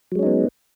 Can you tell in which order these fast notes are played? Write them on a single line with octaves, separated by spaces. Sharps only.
F#3 G#3 C#4 D#4 B3